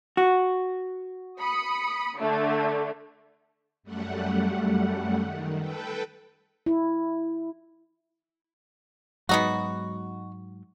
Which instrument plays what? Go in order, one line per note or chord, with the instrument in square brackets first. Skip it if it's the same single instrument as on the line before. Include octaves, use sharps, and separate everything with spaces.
[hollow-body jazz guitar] F#4
[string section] B5 D#6 C#7
D3 A3
[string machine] F#2 G3 A3 F#5
D#3
A4 B4 G5
[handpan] E4
[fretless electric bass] G#2 F#3 G#3 [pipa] B3 D#4 F#4